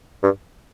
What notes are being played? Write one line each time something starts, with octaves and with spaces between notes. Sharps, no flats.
G2